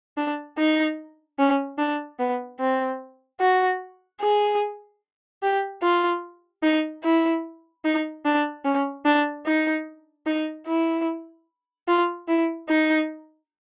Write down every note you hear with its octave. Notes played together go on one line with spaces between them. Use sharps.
D4
D#4
C#4
D4
B3
C4
F#4
G#4
G4
F4
D#4
E4
D#4
D4
C#4
D4
D#4
D#4
E4
F4
E4
D#4